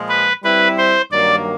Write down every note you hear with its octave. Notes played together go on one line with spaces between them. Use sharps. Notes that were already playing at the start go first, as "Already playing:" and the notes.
Already playing: A#2 F3 G#3
B4
G3 C4 E4 B4
C5
G2 D#3 F#3 A#3 D5